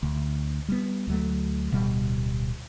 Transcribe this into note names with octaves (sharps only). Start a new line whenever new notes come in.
D2
G3 B3
D2 F#3 A3
D1 B2 G3